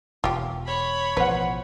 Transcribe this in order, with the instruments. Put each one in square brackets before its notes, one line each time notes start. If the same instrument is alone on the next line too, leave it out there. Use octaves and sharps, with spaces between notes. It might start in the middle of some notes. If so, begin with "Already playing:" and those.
[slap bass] E1 [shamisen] F4 G4
[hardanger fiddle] C#5 B5
[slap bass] A1 B2 F3 [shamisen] B4 [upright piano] C5 F#5